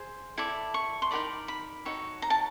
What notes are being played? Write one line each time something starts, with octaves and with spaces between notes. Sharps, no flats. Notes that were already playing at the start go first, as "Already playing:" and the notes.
Already playing: G#4 C5
E4 A4 D5
C#6
C6
D#4 F#4 A#4 D5 B5
B5
D#4 F#4 A4 C#5
A#5
A5